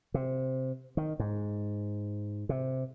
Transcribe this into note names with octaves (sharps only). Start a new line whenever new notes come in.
C3
D#3
G#2
C3